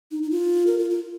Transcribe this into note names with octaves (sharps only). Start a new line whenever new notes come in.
D#4
D#4
F4
A#4
F4
F4